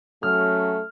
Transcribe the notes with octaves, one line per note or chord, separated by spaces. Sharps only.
F#3 A3 C#4 F6